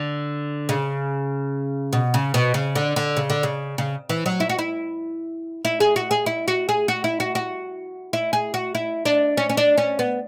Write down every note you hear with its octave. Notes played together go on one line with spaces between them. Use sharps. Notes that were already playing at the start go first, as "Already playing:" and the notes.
Already playing: D3
C#3
B2
C#3
B2
C#3
D3
D3
C#3
D3
C#3
C#3
E3
F#3
E4
F#4
E4
E4
G#4
F#4
G#4
E4
F#4
G#4
F#4
E4
F#4
F#4
E4
G#4
F#4
E4
D4
C#4
C#4
D4
C#4
B3